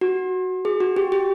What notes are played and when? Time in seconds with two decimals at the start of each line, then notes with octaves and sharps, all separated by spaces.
0.01 F#4
0.65 G#4
0.80 F#4
0.96 G4
1.12 G4